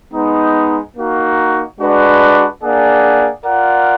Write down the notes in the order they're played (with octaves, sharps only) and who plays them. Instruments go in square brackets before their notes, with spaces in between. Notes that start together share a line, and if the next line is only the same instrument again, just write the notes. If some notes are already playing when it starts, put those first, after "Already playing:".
[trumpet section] G#3 B3 D#4
A#3 D#4 F#4
G#3 D4 F#4 B4 D5
A#3 D4 G#4 D5 F#5
F4 A#4 D5 F#5